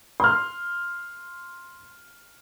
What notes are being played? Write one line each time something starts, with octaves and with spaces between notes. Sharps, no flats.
C6 F6